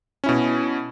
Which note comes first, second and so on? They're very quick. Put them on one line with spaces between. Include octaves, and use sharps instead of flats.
C#4 E4 B2